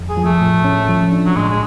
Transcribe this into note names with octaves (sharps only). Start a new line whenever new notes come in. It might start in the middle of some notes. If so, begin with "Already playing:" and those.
Already playing: F2
G#4
F3
A3
A2
C#4
F3
D4
F#3
A2 G#3
G#3